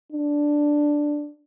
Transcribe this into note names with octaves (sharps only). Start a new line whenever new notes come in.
D4